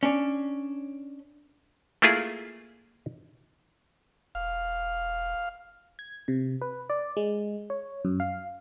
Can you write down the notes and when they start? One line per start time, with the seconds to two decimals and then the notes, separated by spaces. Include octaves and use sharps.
0.03 C#4 D4
2.02 A3 A#3 E4 F4 G#4
4.35 E1 F5
5.99 G#6
6.28 C3
6.61 B4
6.90 D5
7.17 G#3
7.70 C#5
8.05 F#2
8.20 F5